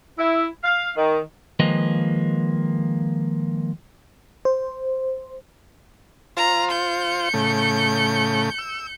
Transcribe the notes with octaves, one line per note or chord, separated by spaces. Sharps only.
E4
F5
D#3
D#3 F3 G#3 A#3 B4 D#5
C5
F4 C5 A#5
G6 C#7
A2 C#3 A3
E6